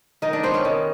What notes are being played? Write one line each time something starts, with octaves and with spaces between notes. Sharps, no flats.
D#3 D#4 D#5
D4 D5
B3 C4 C5
C#4 C#5
D#3